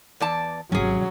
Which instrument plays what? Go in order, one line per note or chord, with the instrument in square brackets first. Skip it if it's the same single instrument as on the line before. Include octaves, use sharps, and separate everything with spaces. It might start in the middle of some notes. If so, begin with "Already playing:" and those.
[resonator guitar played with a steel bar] E2 D5 A5
[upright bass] G#1 C3 [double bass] F#3 [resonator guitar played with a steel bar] C#4 G#4